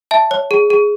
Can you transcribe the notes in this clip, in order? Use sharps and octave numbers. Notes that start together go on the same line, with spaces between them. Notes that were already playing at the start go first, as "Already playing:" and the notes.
E5 A5
C#5
G#4
G#4